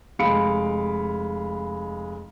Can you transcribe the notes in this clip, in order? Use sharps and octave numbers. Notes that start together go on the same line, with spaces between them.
F1 G#3 F5 B5 C#7 D7